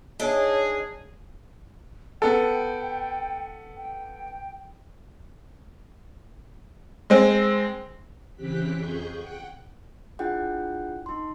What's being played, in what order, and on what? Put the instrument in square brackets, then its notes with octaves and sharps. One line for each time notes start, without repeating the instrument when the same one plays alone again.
[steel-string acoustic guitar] D4 D#5 [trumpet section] D#4 G#4 [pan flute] C#5
[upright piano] B3 A4 [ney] G5
[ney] G5
[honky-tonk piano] G#3 C4
[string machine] C#3 E3 C4 G4 F#6 B6
F2 G#4 C#6 G6
F#5 G5 F#6
[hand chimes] D4 E4 F4 G#4 F#5 G5
D#4 C6